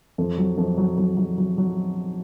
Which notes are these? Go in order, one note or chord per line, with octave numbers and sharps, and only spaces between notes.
F2
F#3
F2
F#3
F#3
F#3
F#3
F#3